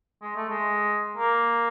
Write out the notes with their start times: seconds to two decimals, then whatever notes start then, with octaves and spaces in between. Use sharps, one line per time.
0.22 G#3
0.36 A3
0.49 G#3
1.17 A#3